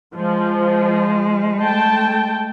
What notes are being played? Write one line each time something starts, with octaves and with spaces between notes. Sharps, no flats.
F3 G#3
A3 G5 A5